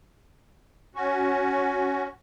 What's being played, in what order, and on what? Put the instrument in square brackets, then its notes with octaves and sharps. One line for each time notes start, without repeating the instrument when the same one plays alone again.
[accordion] C#4 F#4